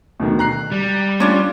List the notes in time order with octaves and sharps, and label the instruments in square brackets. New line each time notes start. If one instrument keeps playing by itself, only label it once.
[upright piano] D2 B2 D#3
A#5 F#6 C7
[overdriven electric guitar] G3
[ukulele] C#4 D4 F4 [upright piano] C6